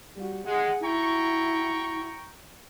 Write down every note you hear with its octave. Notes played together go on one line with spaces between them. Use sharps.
G3 F#4
G#3 G#4 F#5
E4 F#4 G5 A#5 C#6